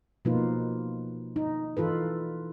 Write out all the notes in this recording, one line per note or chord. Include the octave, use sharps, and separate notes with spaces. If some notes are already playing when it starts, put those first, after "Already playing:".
B2 F3 A#3 D#4 F4 B4
D#4
E3 F4 A4 B4